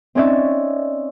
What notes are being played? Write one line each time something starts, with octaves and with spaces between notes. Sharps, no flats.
C4 C#4 D#4 C#5 D5 E5